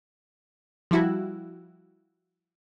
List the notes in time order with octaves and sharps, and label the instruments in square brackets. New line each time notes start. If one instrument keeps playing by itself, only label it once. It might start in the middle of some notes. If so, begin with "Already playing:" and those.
[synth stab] F3 G3 E4 F#4